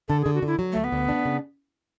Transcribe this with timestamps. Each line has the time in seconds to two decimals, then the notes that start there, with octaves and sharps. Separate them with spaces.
0.08 D3 A4
0.22 G#4
0.26 D3
0.35 F#4
0.42 D3 E4
0.59 F#3
0.72 D2 A3
0.84 B3
0.92 D2
1.09 D4
1.25 C#3